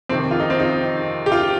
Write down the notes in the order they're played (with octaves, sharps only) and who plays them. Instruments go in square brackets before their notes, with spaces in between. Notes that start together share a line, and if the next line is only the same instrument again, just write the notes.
[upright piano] F2 C3 D#3 C4
F4
D#4
C4
D#4
G4
F4